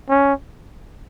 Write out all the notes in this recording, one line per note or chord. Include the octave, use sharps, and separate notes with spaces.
C#4